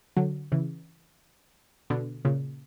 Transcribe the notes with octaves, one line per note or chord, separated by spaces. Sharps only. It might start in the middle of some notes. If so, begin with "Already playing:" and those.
D3 F#3
C#3 E3
B2 D3
A#2 C#3